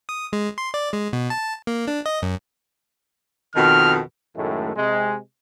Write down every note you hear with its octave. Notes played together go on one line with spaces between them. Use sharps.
D#6
G#3
C6
D5
G#3
B2
A5
A#3
D4
D#5
F#2
F2 B2 D#3 F6
F#2 A2 D#3 G#3 A3
C3 G#3